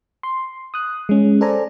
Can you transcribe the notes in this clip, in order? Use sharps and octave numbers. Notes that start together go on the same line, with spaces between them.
C6
D#6 F#6
G#3 C#4
A4 C5 D5 G#5 A#5